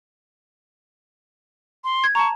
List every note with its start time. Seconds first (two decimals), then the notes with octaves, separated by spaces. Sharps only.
1.84 C6
2.04 G#6
2.15 A5 A#5 C#6